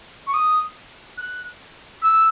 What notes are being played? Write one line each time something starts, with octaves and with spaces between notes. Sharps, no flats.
C#6
D#6
F#6
E6